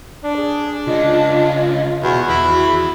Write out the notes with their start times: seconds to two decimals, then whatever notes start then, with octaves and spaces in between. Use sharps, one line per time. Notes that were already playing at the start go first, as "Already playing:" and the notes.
0.24 D4 D5
0.37 G#4
0.87 C#2 C#4 F4 D#5
2.02 E2 B2 F#4
2.29 E2 E4 G#4 B5